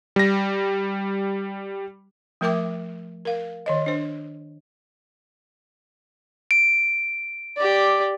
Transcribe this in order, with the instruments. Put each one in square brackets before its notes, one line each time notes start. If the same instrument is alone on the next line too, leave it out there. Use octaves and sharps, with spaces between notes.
[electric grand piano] G3 A#6
[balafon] F3 A3 A#4 E5 G5 D6
A#4 F5
D#3 C#5 D#5
D4 C5
[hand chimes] D7
[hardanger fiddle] G4 D5